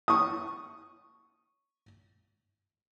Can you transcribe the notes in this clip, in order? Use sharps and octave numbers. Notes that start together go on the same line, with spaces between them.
C#6 D#6